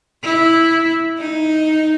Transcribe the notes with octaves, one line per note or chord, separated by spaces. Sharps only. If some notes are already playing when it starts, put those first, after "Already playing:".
E4
D#4